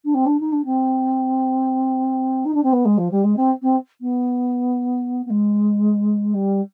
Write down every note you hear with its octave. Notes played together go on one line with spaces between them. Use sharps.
D4
C4
D4
D#4
D4
C4
D#4
D4
C4
B3
G#3
F3
G3
G#3
C4
C4
B3
B3
G#3
G3